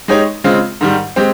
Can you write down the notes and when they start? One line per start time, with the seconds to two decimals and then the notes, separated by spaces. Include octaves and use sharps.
0.08 G#3 D#4 G4 C#5
0.44 C#3 G#3 C4 F4
0.81 G#2 D#3 G3
1.16 G#3 C4 G4